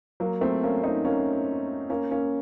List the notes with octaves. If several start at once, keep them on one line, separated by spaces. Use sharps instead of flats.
F#3 A#3
A3 C4
A#3 C#4
C4 D#4
A#3 C#4
A#3 C#4
A#3 C#4